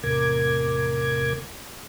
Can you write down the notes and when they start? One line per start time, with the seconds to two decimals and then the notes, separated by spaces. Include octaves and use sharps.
0.04 E2 A2 C3 A#4 D6 G#6